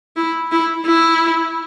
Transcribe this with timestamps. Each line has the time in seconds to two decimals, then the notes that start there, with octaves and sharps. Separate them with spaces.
0.16 E4
0.52 E4
0.86 E4